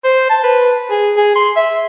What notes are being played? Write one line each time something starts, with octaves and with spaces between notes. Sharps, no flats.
C5
A5
B4
G#4
G#4
C6
E5